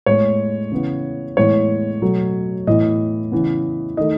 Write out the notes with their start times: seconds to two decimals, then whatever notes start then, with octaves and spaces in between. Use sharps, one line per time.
0.06 A2 G#3 B3 C#5
0.72 C#3 E3 B3
1.37 A2 E3 G#3 B3 C#5
2.02 B2 F#3 A3
2.67 A2 E3 B3 D#5
3.32 C#3 E3 B3
3.97 D#3 A3 D#5